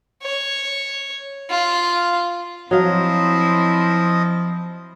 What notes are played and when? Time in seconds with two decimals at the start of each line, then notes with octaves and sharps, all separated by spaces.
0.23 C#5
1.50 F4
2.71 F3 F#3 C4 E4 D#5 F5